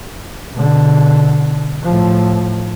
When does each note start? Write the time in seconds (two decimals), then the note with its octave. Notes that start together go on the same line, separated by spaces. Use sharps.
0.54 B2 D3
1.83 A2 F3